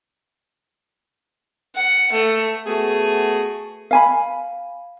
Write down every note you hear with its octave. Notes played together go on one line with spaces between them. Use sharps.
F#5
A3
A3 B3 F#4 G#4
F5 G#5 B5